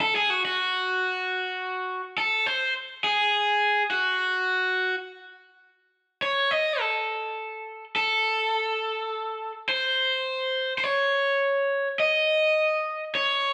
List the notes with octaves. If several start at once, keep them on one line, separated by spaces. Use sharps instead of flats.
A4
G#4
F#4
F#4
A4
C5
G#4
F#4
C#5
D#5
A4
A4
C5
C5
C#5
D#5
C#5